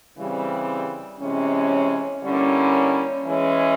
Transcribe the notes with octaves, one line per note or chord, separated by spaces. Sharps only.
C#3 E3 G3 C4
C3 E3 G#3 C#4
D3 G3 A#3 C#4 E4
E3 G#3 C#4